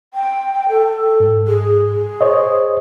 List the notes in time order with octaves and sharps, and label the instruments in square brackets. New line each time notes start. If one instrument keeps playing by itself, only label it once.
[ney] G5
A4
[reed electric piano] G#2
[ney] G#4
G#4
[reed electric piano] C5 C#5 D#5